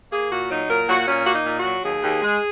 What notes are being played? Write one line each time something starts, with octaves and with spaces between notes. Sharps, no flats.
A#3 G#4
A#2 F#4
F#3 D#4
A#2 A#4
A#2 F#4
A#2 C#4
A#3 F#4
D#4
A#2
F#4
F#3
D#2 G#4
D#2
G#3